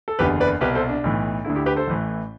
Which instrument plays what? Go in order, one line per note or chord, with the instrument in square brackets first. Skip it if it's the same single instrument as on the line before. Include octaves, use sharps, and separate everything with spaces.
[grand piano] A4
F#1 E2 D3 G4 B4
B4 D5
C2 B2 G4 B4
A4 C5
D4
B1 A2 E3
D2 D3 E4
E4 G4
G4 B4
A4 C5
A1 A2 E3